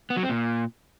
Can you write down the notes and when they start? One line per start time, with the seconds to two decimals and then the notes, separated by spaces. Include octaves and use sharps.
0.10 B3
0.17 F#3
0.23 C4
0.29 A#2